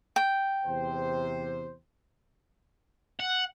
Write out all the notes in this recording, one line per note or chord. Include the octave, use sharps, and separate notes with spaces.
G5
E2 C3 C5
F#5